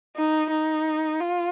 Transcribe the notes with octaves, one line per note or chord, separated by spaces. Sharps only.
D#4
D#4
F4